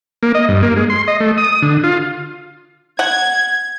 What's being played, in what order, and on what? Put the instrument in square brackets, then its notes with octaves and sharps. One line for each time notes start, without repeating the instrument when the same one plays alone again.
[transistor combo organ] A#3
D#5
G2
A#3
G#3
C6
D#5
A3
D#6
D3
F4
[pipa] F#5 [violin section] G#6